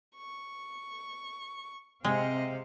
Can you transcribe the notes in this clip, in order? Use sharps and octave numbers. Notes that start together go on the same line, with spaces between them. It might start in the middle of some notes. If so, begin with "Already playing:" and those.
C#6
C3 G#3 C4 D#5 F5